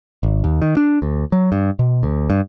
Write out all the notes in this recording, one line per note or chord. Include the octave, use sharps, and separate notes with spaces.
G#1
D#2
D#3
D4
D2
F#3
G2
B2
D2
G2